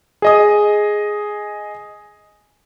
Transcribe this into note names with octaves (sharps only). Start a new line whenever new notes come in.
G#4 D#5 D#6